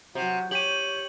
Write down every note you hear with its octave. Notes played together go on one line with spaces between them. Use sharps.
C3 F#3 F#4
G4 C#5 D#7 F#7